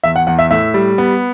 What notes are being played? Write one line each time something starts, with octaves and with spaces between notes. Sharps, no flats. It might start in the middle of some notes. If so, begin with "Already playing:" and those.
E2 E5
F#5
E2 F#5
E5
A2 E5
G3
B3